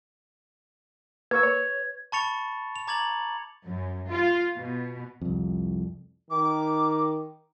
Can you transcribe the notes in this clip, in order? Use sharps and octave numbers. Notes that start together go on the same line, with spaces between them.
A#3 B4 C#6 E6 G#6
C#5
A5 B5 C#6 A6 C#7 F7
F7
A#5 D6 G#6 A6 F7 F#7
F#2
F4
B2
C2 F2
D#3 D6